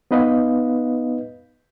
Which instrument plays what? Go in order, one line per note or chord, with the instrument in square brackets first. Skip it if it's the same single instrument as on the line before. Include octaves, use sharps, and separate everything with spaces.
[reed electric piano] B3 D#4 B4 D#5 F5